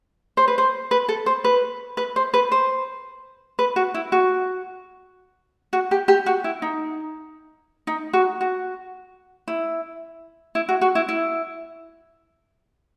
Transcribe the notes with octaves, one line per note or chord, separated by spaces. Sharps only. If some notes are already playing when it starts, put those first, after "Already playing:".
C5
B4
C5
B4
A4
C5
B4
B4
C5
B4
C5
B4
F#4
E4
F#4
F#4
G4
G4
F#4
E4
D#4
D#4
F#4
F#4
E4
E4
F#4
F#4
E4
E4